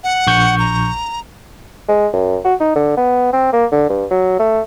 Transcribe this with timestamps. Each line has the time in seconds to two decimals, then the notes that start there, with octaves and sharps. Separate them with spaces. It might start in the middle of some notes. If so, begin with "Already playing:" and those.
0.04 F#5
0.27 A#1 C#6 G6
0.59 A#5
1.88 G#3
2.13 F#2
2.44 F#4
2.60 D#4
2.76 D3
2.97 B3
3.33 C4
3.53 A#3
3.72 D3
3.89 G2
4.11 F#3
4.39 A3